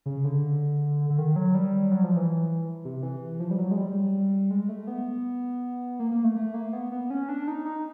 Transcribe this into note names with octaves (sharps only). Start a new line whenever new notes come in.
C#3
D3
D3
D#3
F#3
G3
F#3
F3
E3
C3
E3
F3
G3
F#3
G#3
G3
G#3
A3
B3
A#3
A#3
A3
A3
A#3
B3
B3
C#4
D4
D#4
D#4